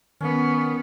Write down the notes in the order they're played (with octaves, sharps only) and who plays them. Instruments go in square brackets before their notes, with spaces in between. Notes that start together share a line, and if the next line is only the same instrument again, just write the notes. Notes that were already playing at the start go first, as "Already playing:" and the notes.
[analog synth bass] D#3 [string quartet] B3 [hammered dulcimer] C#4